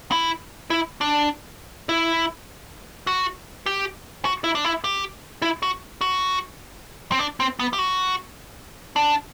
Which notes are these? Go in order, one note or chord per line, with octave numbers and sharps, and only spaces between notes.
E4
E4
D4
E4
F#4
G4
F#4
E4
D4
E4
G4
E4
F#4
F#4
C4
D4
C4
B3
G4
F#4
D4